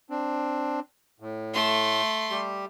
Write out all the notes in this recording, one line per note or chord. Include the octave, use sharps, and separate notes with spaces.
C4 D4
A2
A3 C6
G3 G4